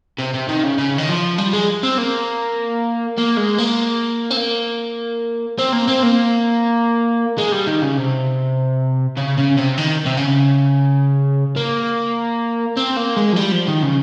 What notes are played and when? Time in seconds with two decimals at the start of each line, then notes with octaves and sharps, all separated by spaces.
0.18 C3
0.34 C3
0.49 D#3
0.63 C#3
0.78 C#3
0.98 D#3
1.09 F3
1.38 G3
1.53 G#3
1.83 C4
1.98 A#3
3.18 A#3
3.37 G#3
3.58 A#3
4.31 C4
4.37 A#3
5.58 C4
5.72 A#3
5.87 C4
6.03 A#3
7.38 G#3
7.52 G3
7.67 D#3
7.82 C#3
7.98 C3
9.17 C#3
9.37 C#3
9.57 C3
9.77 D#3
10.06 C3
10.17 C#3
11.57 A#3
12.77 C4
12.97 A#3
13.17 G#3
13.33 F3
13.36 G3
13.52 F3
13.67 D#3
13.82 C#3